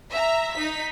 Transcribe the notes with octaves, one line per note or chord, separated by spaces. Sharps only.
E5 A#5
D#4 B6